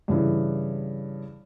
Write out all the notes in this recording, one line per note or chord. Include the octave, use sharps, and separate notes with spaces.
G2 C#3 E3